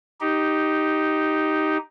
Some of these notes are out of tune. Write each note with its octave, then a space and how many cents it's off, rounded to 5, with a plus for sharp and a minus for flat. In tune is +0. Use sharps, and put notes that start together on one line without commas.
D#4 +0 G4 -5